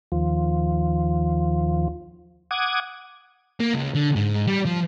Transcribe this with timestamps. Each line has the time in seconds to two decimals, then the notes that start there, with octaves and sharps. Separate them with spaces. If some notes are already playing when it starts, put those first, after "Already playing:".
0.12 D#2 F3
2.51 F#5 D6 D#6 G#6
3.60 A#3
3.74 C#2 C#3
3.95 D3
4.16 G#2
4.47 G3
4.65 F3